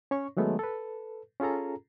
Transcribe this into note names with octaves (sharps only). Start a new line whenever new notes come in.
C#4 C#5 C#6
D#3 F#3 G#3 A3 B3
A4 B4
C#4 F4 G#4 A4 A#5